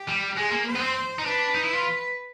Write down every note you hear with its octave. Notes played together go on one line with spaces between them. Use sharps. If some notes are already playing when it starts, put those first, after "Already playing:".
Already playing: G4
G3
G#3 G#4
A#3
C5
B3
C4
D#4
D4 B4
D#4
E4
F4